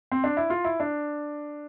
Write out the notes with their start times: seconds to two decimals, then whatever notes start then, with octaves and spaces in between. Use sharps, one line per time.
0.12 C4
0.24 D4
0.37 E4
0.50 F4
0.64 E4
0.80 D4